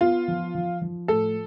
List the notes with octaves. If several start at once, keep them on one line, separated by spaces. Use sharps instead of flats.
B3 F4
F3
F3
F3
A2 A4